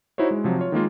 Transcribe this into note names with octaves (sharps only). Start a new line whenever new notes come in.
D#4 E4 F#4 C5 C#5
G#3
C3 F3 F#3
F4 C#5
D#3 G#3 A#3 F4